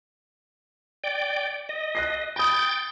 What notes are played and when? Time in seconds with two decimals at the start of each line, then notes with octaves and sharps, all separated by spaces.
1.04 D5 G5
1.69 D#5
1.95 F#6 A#6 C7
2.36 G5 B5 D#6 G6 A6